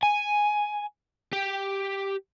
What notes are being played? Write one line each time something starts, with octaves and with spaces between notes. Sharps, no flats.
G#5
G4